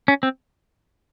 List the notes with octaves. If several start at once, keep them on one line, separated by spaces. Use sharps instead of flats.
C#4
C4